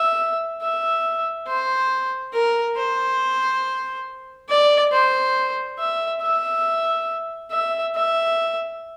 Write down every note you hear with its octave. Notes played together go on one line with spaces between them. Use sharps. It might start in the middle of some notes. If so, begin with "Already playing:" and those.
Already playing: E5
E5
C5
A#4
C5
D5
C5
E5
E5
E5
E5